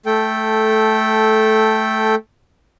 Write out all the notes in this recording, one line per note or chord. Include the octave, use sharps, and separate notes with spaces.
A3 A4 G5